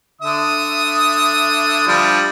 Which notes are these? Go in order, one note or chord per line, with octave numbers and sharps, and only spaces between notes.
D3 E5 D#6
F3 G3 D4